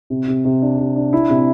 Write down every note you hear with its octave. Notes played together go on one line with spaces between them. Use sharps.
C3
C3
C3
D4
C3
D4
E4
C3